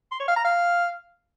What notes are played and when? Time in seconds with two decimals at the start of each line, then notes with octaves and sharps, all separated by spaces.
0.12 C6
0.20 C#5
0.28 F5
0.36 A#5
0.45 F5